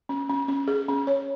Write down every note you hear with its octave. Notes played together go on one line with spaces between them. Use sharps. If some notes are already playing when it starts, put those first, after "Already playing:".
C#4
C#4
C#4
G#4
C#4
C#5